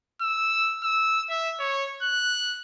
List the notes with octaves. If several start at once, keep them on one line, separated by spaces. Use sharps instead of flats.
E6
E6
E5
C#5
F#6